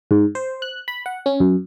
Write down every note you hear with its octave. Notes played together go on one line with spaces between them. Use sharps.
G#2
C5
F#6
B5
F#5
C#4
F#2